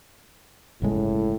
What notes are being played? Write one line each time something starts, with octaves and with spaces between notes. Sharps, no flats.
G1 A2 C#3 G#3